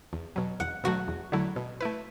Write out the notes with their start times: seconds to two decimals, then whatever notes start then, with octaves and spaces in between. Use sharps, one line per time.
0.13 E2
0.36 B2 F#3
0.60 E2 F#5
0.84 B2 F#3 A3 F#4
1.08 E2
1.32 D3 F#3 A3 E4
1.56 B2
1.81 A3 E4 B4